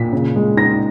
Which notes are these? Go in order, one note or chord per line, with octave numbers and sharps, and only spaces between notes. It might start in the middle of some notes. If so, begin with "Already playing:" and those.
Already playing: A#2 B6
C#3
G#3
D#4 A#6